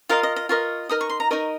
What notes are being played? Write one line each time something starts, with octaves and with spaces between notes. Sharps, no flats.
F4 A#4 D#5 F5
D#5
D#5
F4 A#4 D#5 C#6
D#4 A#4 D#5 D#6
C#6
C6
A#5
D#4 A#4 D#5 C#6